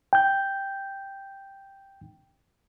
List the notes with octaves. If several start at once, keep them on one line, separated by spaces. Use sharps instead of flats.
G5 G6